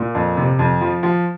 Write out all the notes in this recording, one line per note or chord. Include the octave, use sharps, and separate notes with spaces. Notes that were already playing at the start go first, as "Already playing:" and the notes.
Already playing: A#2
F2
C3
F2
F3
F3